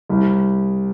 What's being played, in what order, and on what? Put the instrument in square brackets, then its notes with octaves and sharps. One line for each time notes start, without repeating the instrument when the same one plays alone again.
[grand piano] C2